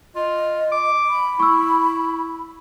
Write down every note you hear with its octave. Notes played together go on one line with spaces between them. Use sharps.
F4 D#5
D6
B5
E4 C#6 E6